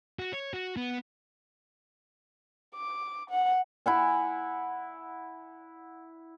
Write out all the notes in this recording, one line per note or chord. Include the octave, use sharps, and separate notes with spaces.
F#4
C#5
F#4
B3
D6
F#5
E4 F#5 G#5